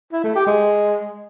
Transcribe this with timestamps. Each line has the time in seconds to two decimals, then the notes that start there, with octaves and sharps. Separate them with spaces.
0.12 E4
0.24 A3
0.35 G4
0.47 G#3